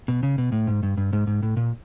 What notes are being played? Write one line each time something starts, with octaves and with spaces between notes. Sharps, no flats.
B2
C#3
B2
A2
G#2
G2
G2
G#2
G#2
A2
A#2